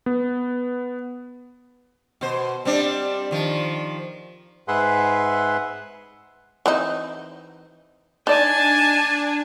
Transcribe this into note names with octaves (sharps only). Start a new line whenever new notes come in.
B3
B2 C5
G3 C4 D4
D#3 F3
G#2 G#4 B4 E5 F#5 C6
E3 C4 D#4
D4 D#4 D5 G#5 A5